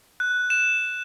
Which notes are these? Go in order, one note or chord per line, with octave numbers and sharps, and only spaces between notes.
F#6
E7